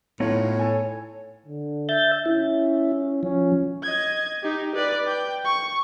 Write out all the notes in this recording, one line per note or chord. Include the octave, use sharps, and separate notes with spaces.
A2 B3 D#4 F4 C#5
A4 G#5
D3
E5 G6 A6
C#4 E4
F3 C#4
D#5 G#6
D#4 G4
B4 D5
G5
C#6